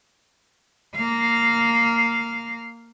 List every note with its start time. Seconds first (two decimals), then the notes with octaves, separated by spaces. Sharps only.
0.96 A#3 F5